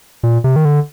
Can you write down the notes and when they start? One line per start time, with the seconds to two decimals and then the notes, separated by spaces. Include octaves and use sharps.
0.23 A#2
0.44 C3
0.56 D#3
0.65 D3